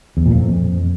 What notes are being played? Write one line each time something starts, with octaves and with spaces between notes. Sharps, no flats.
E2
A#2
F2